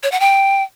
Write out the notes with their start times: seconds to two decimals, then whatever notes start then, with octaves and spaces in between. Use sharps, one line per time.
0.03 C#5
0.12 F#5
0.20 G5